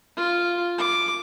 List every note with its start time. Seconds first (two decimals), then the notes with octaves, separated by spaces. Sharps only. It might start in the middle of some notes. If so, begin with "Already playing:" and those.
0.17 F4
0.78 D6